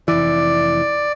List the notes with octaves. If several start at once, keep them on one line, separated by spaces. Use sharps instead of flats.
F1 E3 D5